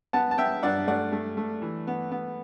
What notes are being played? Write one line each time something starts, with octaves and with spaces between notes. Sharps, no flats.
B3 F#5 A5
A5
B3 E5 G5
G2 D5 F#5
A3 D5 F#5
A3
A3
E3
B3
B3